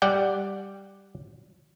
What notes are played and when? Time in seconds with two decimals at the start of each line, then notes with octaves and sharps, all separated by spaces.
0.02 G3 D5 F#5 G5